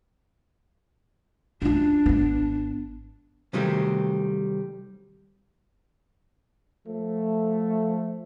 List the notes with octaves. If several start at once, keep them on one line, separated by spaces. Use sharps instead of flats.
F#2 D4 F4
G#1 B3
C3 D#3 F#3 G3 A3 C4
F3 A3